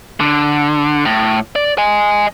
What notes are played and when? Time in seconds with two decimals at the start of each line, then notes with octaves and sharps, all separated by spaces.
0.20 D3
1.05 A2
1.56 D5
1.78 D#5 G#5